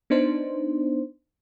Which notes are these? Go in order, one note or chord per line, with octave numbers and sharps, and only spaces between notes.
B3 D4 D#4 C5